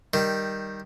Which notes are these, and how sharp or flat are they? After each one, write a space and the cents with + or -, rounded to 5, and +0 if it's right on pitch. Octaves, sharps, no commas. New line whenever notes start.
D#3 +0 G3 +0